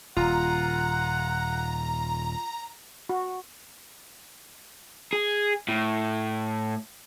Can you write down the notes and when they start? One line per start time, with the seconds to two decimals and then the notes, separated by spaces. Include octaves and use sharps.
0.17 D#1 F4 F#5 A#5
3.09 F#4
5.13 G#4
5.68 A2